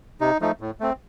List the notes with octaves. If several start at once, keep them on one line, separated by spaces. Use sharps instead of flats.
C3 D#4
F3 A3 D#4
A2
A3 C4